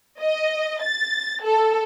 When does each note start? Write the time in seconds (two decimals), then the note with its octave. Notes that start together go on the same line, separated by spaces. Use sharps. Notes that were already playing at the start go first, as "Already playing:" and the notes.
0.19 D#5
0.82 A6
1.43 A4